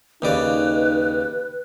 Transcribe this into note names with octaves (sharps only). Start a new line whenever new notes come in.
D#2 C#3 D#4 B4 D5